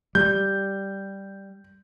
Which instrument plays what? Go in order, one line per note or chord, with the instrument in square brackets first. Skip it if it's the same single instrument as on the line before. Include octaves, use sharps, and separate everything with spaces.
[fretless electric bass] G3 [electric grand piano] G6